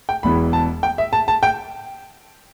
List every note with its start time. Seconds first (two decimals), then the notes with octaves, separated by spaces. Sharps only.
0.09 G5
0.23 E1 E2 E3 B5
0.53 A5
0.83 G5
0.98 E5
1.13 A5
1.28 A5
1.43 G5